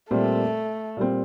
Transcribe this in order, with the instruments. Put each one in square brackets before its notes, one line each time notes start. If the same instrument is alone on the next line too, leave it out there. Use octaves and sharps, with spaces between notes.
[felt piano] A#2 G3 C4 [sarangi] A3
[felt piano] A#2 G3 C4